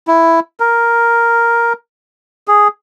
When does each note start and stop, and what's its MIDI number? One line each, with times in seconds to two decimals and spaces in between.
0.08 0.40 64
0.60 1.73 70
2.48 2.68 68